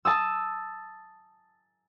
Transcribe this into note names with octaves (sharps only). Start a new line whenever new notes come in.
A5 D#6 E6